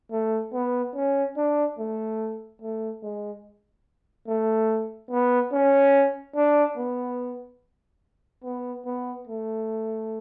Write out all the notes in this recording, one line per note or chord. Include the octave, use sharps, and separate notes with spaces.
A3
B3
C#4
D4
A3
A3
G#3
A3
B3
C#4
D4
B3
B3
B3
A3